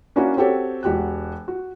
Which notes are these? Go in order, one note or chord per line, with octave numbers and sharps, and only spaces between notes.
A#3 C#4 D4 E4 F#4
C4 F#4 G4 A4 C#5
E1 F#4 G4 F#6
F#4